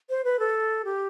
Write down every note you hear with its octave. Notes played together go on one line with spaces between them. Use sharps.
C5
B4
A4
G4